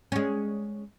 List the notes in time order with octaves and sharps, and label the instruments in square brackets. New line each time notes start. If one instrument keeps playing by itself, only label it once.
[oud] G#3 C#4